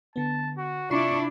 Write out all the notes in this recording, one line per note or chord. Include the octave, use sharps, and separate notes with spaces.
D3 B3 A5
F#4
C3 D4 E4 F4 C#6 C7